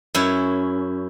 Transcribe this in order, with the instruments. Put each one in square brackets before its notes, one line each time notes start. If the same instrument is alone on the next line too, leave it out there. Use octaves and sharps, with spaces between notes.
[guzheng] F#2 C#4 E4